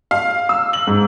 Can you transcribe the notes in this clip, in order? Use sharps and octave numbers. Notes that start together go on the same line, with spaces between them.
F5
E6
F#7
G#2